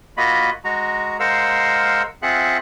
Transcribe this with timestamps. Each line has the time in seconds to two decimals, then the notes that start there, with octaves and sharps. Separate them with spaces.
0.17 A#3 F4 F#4 D#5 B5
0.65 G#3 F#4 A#5
1.20 G#3 A#4 C5 F5 F#5 E6
2.23 C4 F4 G#4 E5 F#5 F#6